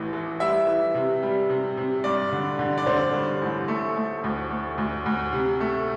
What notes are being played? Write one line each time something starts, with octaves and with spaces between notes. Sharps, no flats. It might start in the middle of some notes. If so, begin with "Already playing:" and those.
Already playing: A1 A2 E3
E3
G3 E5
E3
C3
G3
C3
C3
G2 D5
D3
D3
D5
D3 C5
G2
A1
A3
A3
D2
A3
D2
D2
C3
A3